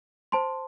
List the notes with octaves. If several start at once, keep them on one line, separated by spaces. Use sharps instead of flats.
C5 A5 C6